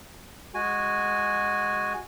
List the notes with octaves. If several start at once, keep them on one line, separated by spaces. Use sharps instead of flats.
G#3 F#4 G#5